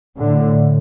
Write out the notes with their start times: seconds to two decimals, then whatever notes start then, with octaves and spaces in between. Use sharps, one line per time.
0.18 A2 D3